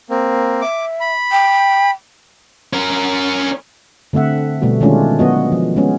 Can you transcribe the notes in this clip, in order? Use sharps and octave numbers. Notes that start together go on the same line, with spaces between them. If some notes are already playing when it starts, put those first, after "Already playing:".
A#3 C4
E5 D6
B5
G5
C#4 A#4
D3 A3 C4 E5 F#5
B2 G3 A3 B3 F#4
D#3 G#3 A3 C#4 D4 F4
F#3 B3 F#4 D#5
F3
G#3 B3 C#4